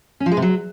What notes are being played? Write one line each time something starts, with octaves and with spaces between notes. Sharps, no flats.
C#4
F3
G#3
C3
F#3